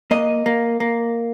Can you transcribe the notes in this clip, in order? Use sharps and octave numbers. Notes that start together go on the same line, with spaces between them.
A#3 D#5
A#3
A#3